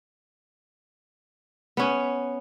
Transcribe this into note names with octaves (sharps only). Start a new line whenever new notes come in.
B3 C#4